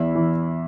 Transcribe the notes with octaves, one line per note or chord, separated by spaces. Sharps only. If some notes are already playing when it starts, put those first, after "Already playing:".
Already playing: E2 E3 E4
E3